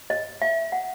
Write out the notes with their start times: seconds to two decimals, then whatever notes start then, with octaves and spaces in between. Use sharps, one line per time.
0.10 D#5
0.42 E5
0.72 F#5